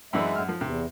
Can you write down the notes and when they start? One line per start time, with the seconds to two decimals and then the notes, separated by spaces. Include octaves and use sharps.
0.13 F#2 E3 G#3 D4 E5
0.35 F#2 F6
0.48 F3
0.61 E2 C3